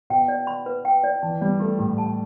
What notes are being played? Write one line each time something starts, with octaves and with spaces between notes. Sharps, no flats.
B2 G5
D5
B5
B4
G5
D5
E3 A5
G3 D5
A3 G4
A2 G4
A5